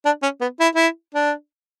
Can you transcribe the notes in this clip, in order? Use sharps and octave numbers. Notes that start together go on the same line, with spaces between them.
D4
C#4
B3
E4
E4
D4